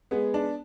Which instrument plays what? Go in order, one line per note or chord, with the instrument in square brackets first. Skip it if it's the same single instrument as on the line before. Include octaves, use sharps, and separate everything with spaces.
[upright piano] G#3 G#4 [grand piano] B3
[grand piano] D4